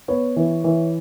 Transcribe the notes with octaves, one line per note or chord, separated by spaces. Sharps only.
B3 C#5
E3
E3